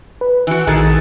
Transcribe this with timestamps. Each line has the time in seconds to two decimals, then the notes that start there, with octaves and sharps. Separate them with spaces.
0.21 B4
0.47 E3 F#4
0.67 A#1 D#3 G#4 A4 A6